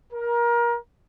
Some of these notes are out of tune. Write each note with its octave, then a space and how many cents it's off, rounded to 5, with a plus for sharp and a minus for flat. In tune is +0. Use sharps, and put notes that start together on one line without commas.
A#4 +25